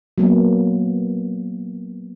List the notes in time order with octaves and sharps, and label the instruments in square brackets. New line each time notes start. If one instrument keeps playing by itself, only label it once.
[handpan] F#3 A#3 B3